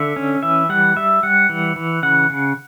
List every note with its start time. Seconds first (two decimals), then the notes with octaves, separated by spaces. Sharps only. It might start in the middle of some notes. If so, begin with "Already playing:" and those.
Already playing: D3 E5
0.16 C#4
0.43 E3 E5
0.69 G3 F#5
0.96 G3 E5
1.23 G3 F#5
1.49 E3
1.76 E3
2.03 C#3 F#5
2.30 C#3